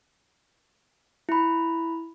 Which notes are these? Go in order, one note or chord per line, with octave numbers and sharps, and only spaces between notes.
E4 B5